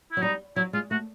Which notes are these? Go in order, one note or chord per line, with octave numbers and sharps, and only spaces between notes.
E4
F#3
G3 D#4
F#3 E4
G#3 F4
A3 F#4